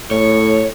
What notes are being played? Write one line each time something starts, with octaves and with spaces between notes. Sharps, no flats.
A2 C#5